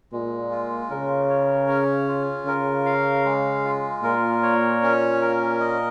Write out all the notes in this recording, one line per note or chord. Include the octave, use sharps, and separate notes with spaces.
A#2 G#3
F4
C#3 A#4
C#5
C#4
F4
C#3 A#4
F5
G#3
F4
A#2 A#4
C#5
C#4
A#4
D#5